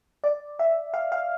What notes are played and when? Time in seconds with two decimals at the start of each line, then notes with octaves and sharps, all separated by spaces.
0.24 D5
0.59 E5
0.94 F5
1.12 F5